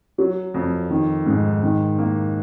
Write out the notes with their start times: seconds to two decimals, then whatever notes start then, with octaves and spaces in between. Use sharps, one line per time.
0.18 F#3
0.54 F2
0.90 D#3
1.26 G#2
1.63 D#3
1.98 A#3